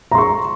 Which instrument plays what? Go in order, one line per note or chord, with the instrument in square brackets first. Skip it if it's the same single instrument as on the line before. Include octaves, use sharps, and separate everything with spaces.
[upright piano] A#5
C6
C#6